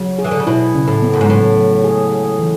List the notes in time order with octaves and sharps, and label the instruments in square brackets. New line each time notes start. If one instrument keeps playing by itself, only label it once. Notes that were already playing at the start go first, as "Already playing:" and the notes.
Already playing: [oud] C#3 [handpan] F#3
[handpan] G#4
[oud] E3
D3
C#3
[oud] B2 [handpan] E4
[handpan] C#3
[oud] A2
[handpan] B3
[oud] F#2
G#2
[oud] A2 [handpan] F#3
[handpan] F#3
G#4
G#4
E3